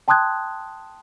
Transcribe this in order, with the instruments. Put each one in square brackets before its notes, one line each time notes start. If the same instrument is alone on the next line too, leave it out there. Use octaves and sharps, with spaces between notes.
[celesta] G5 A5 C6 D#6 F#6 G#6